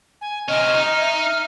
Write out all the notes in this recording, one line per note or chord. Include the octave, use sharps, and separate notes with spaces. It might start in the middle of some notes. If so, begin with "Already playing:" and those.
G#5
C3 C#4 D#5 F6
D#4
E5